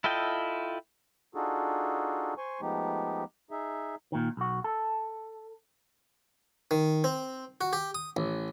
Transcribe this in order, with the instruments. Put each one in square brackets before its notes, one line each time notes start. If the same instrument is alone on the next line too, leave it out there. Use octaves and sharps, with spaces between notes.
[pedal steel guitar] E4 F4 A4 D#5 G5
[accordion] D4 D#4 F4 F#4 G#4 A4
C5 G#5 C6 C#6
F3 G#3 A3 B3 D#4 G4
D#4 G#4 E5
[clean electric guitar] A#2 D#3
B1 F#4
A4
[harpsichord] D#3
C4
F#4
G4
D#6
A1